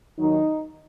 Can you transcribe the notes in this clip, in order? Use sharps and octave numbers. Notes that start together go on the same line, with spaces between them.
D#2 D#3 F#3 D#4